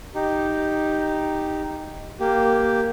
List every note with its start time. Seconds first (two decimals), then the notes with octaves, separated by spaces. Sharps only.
0.15 D#4 G4
2.20 A#3 G4